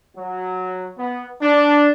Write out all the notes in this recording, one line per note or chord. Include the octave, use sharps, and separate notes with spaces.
F#3
B3
D4